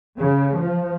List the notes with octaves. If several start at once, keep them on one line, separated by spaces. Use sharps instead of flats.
C#3
F3